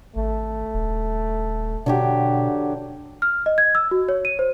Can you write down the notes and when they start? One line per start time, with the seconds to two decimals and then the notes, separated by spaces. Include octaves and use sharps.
0.16 G#1 A3
0.74 D#1
1.86 B2 D3 F#3 G4
3.22 F6
3.46 D#5
3.58 G#6
3.75 E6
3.91 F#4
4.09 C#5
4.25 D#7
4.39 C5